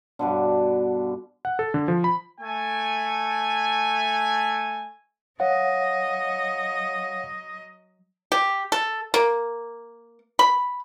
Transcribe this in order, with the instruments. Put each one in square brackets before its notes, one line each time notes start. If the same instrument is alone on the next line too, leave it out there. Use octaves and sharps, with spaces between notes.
[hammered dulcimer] G2 B2 D3
[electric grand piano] F#5
A4
D3
F3
B5
[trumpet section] A3 G#5
[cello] F#3 D#5 [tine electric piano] C#5 F5 F#5
[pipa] G4
A4
A#3
B5